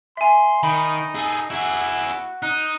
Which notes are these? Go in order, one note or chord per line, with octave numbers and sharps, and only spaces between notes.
E5 G#5 C6
D#3 D#4 B5
G#4 A4
E4 F#4 G#4
D#4 F#6